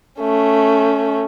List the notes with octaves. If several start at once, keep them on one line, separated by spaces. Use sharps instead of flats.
A3 C#4